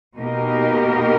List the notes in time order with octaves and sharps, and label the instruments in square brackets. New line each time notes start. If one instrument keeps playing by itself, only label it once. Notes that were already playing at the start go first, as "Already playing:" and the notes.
[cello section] B2 A#3 D#4 G4 A#4